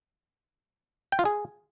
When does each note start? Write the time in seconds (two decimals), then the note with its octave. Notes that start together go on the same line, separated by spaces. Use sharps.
1.12 G5
1.19 F4
1.25 G#4